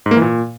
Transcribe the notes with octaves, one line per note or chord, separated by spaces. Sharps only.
G#2
A#3
E3
A#2